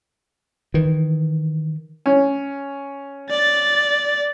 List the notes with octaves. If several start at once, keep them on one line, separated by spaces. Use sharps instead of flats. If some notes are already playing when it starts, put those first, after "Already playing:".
D#3 E3
C#4
D5 A6